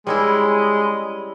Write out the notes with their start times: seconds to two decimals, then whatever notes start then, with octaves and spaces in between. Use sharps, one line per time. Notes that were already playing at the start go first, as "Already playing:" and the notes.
0.07 G3 G#3 C#4 E4